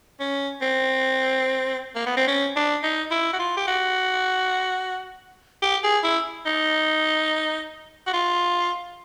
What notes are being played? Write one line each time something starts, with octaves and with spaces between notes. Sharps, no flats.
C#4
C4
A#3
B3
C4
C#4
D4
D#4
E4
F#4
F4
G4
F#4
G4
G#4
E4
D#4
F#4
F4